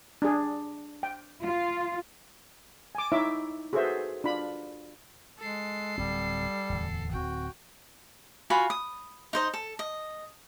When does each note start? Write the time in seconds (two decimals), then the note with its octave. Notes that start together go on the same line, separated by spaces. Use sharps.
0.22 D4 G#4
1.03 G5
1.44 F4
2.95 G#5 D6
3.12 D#4 E4 C#5 E5 D6
3.73 F#4 G#4 A4 B4 C5 E5
4.24 D4 F4 B5
5.39 G#3 A4 C7
5.98 D1 G3 C4
6.69 D1 E2
7.11 D1 C4 F#4 G5
8.50 F4 F#4 G#5 B5
8.70 D#6
9.33 D#4 C5 D#5
9.54 A4
9.79 D#5